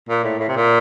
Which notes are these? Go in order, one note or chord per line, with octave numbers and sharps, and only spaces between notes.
A#2
A2
A2
C3
A#2